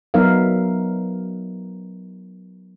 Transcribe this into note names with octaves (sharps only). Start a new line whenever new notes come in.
F#3 B3 D#4 A#4 E5 F5